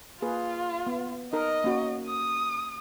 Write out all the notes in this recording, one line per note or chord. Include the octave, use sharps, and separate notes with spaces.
A#3 F4 G#4 B4
B3
D#4 A#4 D#5
A#3 C#4 F#4
D#6